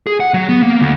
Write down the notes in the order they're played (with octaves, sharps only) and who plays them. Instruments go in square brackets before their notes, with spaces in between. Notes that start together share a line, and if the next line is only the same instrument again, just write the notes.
[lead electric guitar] G#4
F#5
F#3
B3
A#3
D2